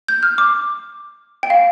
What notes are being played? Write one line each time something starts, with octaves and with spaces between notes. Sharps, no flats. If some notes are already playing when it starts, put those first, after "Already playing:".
G6
F6
D6
G5
F5